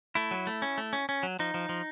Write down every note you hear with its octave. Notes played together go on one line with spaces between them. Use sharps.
A3 E4
F#3
A3
C#4
A3
C#4
C#4
F#3
F3 D#4
F3
F3